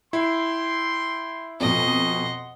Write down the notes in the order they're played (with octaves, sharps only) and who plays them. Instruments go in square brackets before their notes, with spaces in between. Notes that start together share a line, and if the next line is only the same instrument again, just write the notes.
[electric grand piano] E4 [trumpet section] G5 C6
[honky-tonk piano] F2 B2 [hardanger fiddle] D#5 [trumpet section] F#5 C6